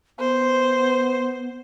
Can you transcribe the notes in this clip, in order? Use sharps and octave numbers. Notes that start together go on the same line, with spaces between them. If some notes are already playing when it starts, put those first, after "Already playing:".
B3 C5